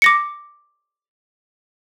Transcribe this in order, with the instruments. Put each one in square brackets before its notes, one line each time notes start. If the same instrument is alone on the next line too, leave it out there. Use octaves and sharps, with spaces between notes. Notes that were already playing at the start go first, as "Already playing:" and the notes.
[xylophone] D6 A#6 C#7